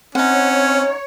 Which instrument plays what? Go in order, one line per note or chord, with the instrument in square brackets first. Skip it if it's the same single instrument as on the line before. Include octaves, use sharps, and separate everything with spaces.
[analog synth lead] C4 [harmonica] C#4 [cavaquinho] D#4 F#5 [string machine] C#5